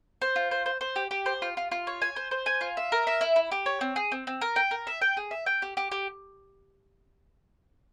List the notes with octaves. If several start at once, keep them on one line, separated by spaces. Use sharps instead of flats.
C5
F4
C5
C5
C5
G4
G4
C5
F4
F4
F4
C#5
G#5
C5
C5
G#5
F4
E5
A#4
E5
E4
E4
G4
C#5
C4
G#4
C4
C4
A#4
G5
A#4
E5
G5
G#4
E5
G5
G4
G4
G4